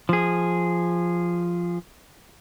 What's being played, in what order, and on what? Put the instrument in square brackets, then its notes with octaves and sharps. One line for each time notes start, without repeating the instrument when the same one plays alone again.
[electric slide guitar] F3 G#4